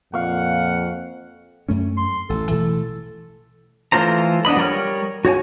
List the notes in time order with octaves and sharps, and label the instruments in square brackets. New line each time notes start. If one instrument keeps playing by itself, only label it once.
[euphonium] F2 [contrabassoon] A#2 [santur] F5 C#6 [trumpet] F#5
[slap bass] F#2 A3 C#4
[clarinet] C6
[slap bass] A1 [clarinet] A4
[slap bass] B2 E3 A3 [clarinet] A4
[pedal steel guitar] E3 A3 F4 C5 A#5
B3 D4 D#5 B5
G3 A#4 C#5 F6
F#4 C#5 F#5 G#5